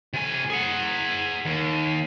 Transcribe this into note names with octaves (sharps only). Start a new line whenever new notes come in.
C3 G#5
G#4 F#5
D#2